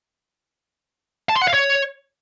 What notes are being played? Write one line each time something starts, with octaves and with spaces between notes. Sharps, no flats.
A5
C6
F#5
F5
C#5